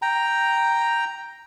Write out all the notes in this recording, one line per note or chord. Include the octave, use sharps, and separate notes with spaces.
G5 A#5